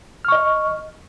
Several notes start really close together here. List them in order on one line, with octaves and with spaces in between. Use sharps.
F6 C#6 D#5